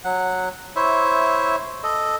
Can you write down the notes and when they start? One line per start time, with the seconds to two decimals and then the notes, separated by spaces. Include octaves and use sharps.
0.04 F#3 F#5
0.76 E4 C5 C#5 E5
1.83 A4 D#5